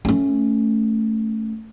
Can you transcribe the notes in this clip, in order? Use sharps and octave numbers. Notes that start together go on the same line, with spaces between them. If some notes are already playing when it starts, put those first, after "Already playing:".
A3 C#4